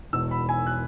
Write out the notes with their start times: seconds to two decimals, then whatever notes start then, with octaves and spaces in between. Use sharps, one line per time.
0.13 E1 E2 B2 E6
0.31 B5
0.49 G#5
0.67 F#6